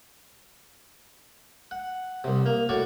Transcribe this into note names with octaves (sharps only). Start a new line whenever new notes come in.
F#5
C2 C3
A#3
A2 F#4 D5 F#5 C#6